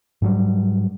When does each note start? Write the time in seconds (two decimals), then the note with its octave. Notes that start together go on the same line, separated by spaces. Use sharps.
0.22 G#2 F#3 G3